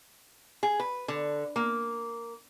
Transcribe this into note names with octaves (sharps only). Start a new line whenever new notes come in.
G#4
B4
D3
A#3